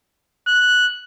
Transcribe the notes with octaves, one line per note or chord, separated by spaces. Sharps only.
F#6